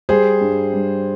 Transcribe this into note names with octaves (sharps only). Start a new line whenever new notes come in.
G3 G#4 C5
G2
G2